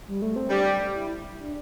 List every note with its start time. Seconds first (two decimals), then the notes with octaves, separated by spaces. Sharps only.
0.08 G3
0.22 A3
0.36 C4
0.50 G3 D4
0.94 E4
1.39 D4